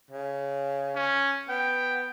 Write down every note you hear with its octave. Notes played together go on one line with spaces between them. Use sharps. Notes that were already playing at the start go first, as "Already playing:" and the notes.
C#3
C#4
B3 G5